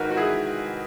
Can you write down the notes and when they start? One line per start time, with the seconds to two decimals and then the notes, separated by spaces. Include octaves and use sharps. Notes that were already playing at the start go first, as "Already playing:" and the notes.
Already playing: G#2 D#3 F#4 A#4 B4
0.11 F#4
0.17 E4 G#4